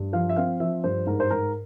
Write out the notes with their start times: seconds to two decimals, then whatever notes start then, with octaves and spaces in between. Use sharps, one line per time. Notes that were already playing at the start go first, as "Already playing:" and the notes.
Already playing: G2
0.13 F3 F5
0.29 E5
0.36 C4 F5
0.60 F3 E5
0.84 G2 C5
1.07 G#2 A#4
1.20 C5
1.30 G#2 A#4